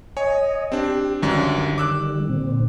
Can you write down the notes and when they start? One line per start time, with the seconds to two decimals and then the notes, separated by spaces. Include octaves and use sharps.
0.17 C#5 D#5 G#5
0.72 C4 D4 G4
1.22 C#2 F#2 D3 D#3 G3 D4
1.78 D6 E6 F#6
2.29 A#2 D3 C4